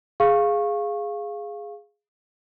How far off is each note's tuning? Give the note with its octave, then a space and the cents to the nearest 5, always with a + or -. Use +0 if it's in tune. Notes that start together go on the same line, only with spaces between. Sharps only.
G#4 +0 F5 +0 C#6 -20